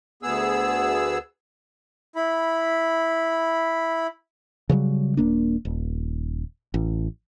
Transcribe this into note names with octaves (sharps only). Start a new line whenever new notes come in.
D2 B3 G#4 E6
E4 B5
C#3 E3 F#3 G3
D#1 A#3 D4
D#1
A1